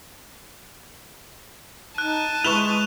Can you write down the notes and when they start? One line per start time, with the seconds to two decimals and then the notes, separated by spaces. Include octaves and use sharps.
1.98 D#4 A5 F#6 D#7
2.44 G#3 E4 B4 C#6 F#6 F7 G7